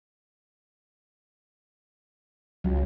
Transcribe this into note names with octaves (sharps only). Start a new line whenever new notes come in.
C#2 F#3